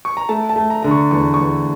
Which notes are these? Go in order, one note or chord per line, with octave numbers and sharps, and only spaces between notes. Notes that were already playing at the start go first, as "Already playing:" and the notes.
C#6
A#5
A3 A5
A5
A3
A#5
D3 A#5
C#6
E2 C#6
E2 C#6